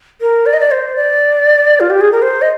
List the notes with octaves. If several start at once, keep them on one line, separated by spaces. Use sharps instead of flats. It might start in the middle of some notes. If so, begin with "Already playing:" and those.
A#4
D5
D#5
D5
C5
D5
F4
G4
G#4
A#4
C5
D#5